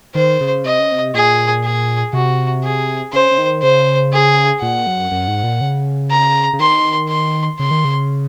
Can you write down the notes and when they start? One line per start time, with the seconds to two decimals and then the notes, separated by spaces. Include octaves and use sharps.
0.15 D#3 C5
0.41 C#3
0.65 C3 D#5
0.79 C#3
0.92 C3
1.14 A#2 G#4
1.64 G#4
2.13 C3 F#4
2.63 G#4
3.12 C#3 C5
3.31 C#3
3.38 D#3
3.62 C#3 C5
4.12 G#4
4.61 A#2 F#5
4.87 F#2
5.11 F#2
5.28 G#2
5.44 A#2
5.61 C#3
6.10 A#5
6.53 C#3
6.60 D#3 C6
7.09 C6
7.59 C#3 C6
7.71 D#3
7.85 C#3